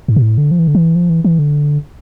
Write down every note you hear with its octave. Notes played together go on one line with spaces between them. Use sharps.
G#2
B2
A2
D3
F3
E3
D3
E3
F3
E3
E3
D3